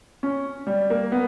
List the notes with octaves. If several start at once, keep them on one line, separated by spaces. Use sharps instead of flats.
C#4
G3
A#3
B3